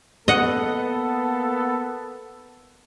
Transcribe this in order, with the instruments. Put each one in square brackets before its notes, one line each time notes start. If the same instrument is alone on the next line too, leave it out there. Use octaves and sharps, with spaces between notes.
[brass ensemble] A#3 B3 A4 [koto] D#5 F#5